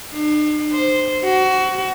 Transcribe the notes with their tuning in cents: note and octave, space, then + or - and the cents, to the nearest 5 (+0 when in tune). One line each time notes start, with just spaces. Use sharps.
D4 +45
C5 -5
F#4 +20